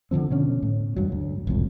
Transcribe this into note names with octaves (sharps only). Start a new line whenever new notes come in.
D3 D#3 F3 C4
B2 D3 C#4
A2
E2 G2 F#3
D2
E1 C2 F2 A2